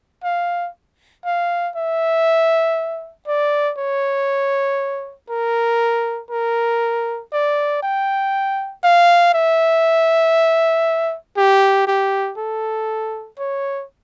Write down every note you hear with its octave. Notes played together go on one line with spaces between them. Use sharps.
F5
F5
E5
D5
C#5
A#4
A#4
D5
G5
F5
E5
G4
G4
A4
C#5